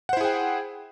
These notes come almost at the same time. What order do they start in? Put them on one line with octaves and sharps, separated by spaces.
F#5 C5 E4 G#4 G5